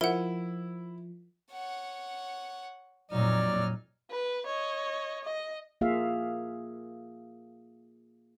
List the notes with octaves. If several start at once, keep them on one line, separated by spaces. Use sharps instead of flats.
F3 E4 A#4 F#5
C#5 F#5
F2 A#2 F#3 D#4 D5 F6
B4
C#5 D#5
D#5
A#3 F4 G#4 E5 F5